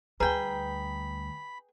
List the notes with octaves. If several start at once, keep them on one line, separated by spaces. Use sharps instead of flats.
D2 G3 G#4 B4 G5 A#5 B5